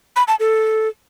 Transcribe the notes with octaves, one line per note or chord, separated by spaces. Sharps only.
B5
A5
A4